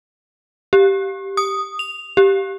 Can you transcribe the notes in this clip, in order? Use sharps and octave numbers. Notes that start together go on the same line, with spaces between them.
G4
D#6
F7
G4